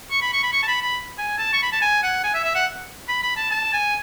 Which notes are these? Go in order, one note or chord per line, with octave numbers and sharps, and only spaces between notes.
C#6
B5
C#6
B5
C#6
A5
B5
B5
G#5
A5
C#6
B5
A5
G#5
F#5
G#5
E5
E5
F#5
B5
B5
A5
A5
G#5